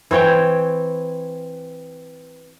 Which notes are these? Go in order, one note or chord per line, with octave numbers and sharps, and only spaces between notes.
E3 C4 C#5 G5